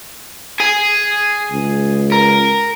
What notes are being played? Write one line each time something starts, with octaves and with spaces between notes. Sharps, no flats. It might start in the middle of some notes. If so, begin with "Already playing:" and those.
G#4 G#5
C#2
A#4